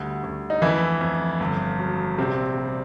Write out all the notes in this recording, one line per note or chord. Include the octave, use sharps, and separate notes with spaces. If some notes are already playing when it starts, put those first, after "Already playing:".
Already playing: D2 G3
D2
D#4
F2 E3 E4
F2
G1
F#3
A#1 C3 C4
G3